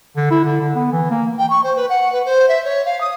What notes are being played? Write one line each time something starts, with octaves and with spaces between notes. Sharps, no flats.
D3
E4
D3
D3
B3
E3
A#3
G5
C#6
C5
B4
F#5
B4
C5
E5
C#5
F5
D#6